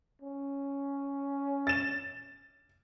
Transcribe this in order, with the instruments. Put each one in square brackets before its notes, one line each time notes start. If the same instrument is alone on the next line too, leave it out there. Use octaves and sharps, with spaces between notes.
[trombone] C#4
[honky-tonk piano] A6 E7